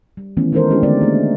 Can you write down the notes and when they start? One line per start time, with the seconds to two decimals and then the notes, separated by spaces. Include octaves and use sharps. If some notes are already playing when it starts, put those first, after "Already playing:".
0.17 G3
0.37 D#3 E3 A3 B3 C#4
0.52 D#3 G#3 D#4 A4 A#4 C5
0.70 G#3 C#4 D4 E4 G4
0.83 D3 G#3 A3 B3 C5 D5
1.00 A3 A#3 F#4